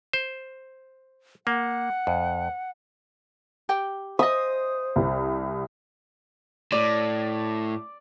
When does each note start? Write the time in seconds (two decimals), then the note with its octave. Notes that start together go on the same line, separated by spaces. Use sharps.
0.13 C5
1.47 A#3 F#5
2.07 F2
3.69 G4 G5
4.19 C5 D#5 E5 D#6
4.96 C2
6.72 A2 D5